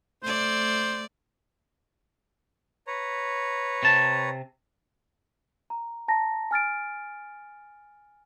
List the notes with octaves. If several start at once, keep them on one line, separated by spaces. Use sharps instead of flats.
A3 C5 D5
B4 C#5 A#5
C3 A5
A#5
A5 A#5 A#6
G#5 F6 A6 D7